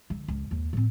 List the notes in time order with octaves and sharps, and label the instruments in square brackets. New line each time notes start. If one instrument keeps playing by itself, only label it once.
[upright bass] D3
C#2
D#2
A2 C4